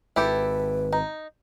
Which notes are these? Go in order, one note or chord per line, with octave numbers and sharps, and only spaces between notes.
G#1 E4 G4 A4 B4
D#4